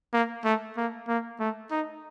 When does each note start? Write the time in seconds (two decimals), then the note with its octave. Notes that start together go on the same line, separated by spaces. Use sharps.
0.13 A#3
0.45 A3
0.77 A#3
1.08 A#3
1.40 A3
1.71 D#4